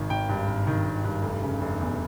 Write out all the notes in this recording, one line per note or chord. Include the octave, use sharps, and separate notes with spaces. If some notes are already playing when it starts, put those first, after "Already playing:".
Already playing: G#1 D#3
G#1 G5
G2
G#1
D#3
G#1
G2
F1
C#3
F1
E2